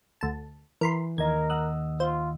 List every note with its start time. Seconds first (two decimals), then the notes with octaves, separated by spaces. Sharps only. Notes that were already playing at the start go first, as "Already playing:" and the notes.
0.21 D2 A5
0.81 E3 A#4 B5 C6
1.18 D#2 A#4 D#5 G#6
1.50 F#5 D#6 E6 F#6
2.00 F4 C5